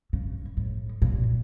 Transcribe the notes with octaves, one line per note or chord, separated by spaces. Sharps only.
C#3
A2
A#2